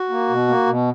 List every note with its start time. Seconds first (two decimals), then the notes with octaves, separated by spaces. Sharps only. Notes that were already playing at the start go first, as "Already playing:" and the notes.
Already playing: F#4
0.10 A#3
0.29 B2
0.47 A#3
0.66 B2